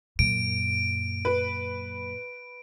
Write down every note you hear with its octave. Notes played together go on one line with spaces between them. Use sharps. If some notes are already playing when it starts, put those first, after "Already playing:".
F#2 A#2 D7
B4